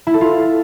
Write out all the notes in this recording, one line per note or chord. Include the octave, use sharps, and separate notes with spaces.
E4
A4
F4